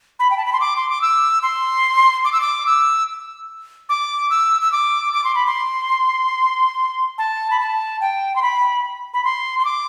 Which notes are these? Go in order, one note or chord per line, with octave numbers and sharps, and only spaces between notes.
B5
G5
A5
B5
C6
D6
C6
D6
E6
C6
D6
E6
D6
E6
D6
E6
E6
D6
D6
C6
B5
C6
A5
B5
A5
G5
C6
B5
B5
C6
C6
D6